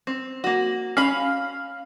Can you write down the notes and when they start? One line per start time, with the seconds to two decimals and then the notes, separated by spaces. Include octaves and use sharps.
0.07 C4
0.44 A#3 F#4
0.97 C#4 F5 B5